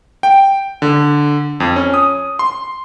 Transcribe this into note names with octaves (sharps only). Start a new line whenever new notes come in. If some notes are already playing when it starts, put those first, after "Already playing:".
G5
D3
F2
C#4
D#6
C6